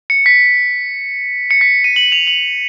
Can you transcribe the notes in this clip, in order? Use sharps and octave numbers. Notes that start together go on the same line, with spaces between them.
C#7
B6
C#7
B6
D#7
F#7
F7
F#7